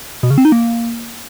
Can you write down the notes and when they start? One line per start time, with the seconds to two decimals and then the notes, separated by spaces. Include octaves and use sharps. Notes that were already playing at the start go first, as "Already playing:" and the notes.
0.23 B2
0.30 C#3
0.38 C4
0.45 D#4
0.52 A#3